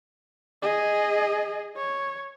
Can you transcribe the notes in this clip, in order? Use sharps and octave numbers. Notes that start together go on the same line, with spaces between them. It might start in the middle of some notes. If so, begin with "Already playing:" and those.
G#4 D#5
C#5